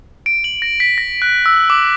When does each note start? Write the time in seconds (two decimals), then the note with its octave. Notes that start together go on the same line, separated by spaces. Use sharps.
0.26 D7
0.44 F#7
0.62 A#6
0.80 B6
0.98 A#6
1.22 F#6
1.46 E6
1.70 D6